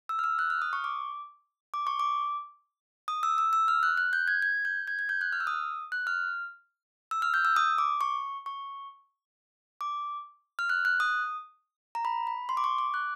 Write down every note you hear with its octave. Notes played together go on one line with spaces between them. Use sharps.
E6
F6
E6
F#6
F6
D#6
C#6
D6
D6
C#6
D6
D#6
E6
E6
E6
F6
F#6
F#6
G6
G#6
G#6
G6
G#6
G#6
G6
F#6
F6
E6
D#6
F#6
F6
E6
F6
G6
E6
D#6
D6
C#6
C#6
D6
F6
F#6
F#6
D#6
A#5
B5
B5
C6
D6
C#6
D6
F#6